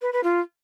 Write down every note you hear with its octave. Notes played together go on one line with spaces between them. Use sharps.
B4
B4
F4